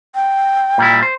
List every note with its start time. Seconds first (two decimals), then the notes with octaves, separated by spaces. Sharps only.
0.15 G5
0.78 A#2 G3 E4
1.03 C5